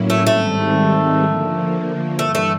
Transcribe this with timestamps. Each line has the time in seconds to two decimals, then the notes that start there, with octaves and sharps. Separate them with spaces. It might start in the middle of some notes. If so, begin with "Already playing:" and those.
Already playing: A2 F#3 A#3 C#4 E4
0.10 A3
0.26 G#2 D#3 G3 A3 C4
1.22 D3 F3 A#3
2.18 G2 E3 G3 A3
2.35 A3